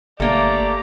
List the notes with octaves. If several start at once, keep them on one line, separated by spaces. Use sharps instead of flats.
G1 A3 A#3 G4 D5 A#5